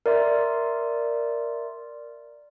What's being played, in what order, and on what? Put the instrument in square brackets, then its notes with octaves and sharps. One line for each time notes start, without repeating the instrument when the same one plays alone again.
[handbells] A#4 D5 E5 C6